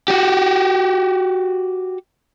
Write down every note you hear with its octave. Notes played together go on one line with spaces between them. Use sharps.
F#4 G4